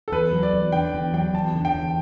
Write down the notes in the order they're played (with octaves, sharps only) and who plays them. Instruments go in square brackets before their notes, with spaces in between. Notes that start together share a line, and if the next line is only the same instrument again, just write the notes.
[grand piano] A4
[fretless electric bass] E2 [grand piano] B4
[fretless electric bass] F#3
[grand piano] D5
[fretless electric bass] E2
[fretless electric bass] D3 [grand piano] G5
[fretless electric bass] E2
[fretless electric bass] F#3 [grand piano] G5
[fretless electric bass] E2 [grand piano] A5
[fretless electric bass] D3
[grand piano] G5
[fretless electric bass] E2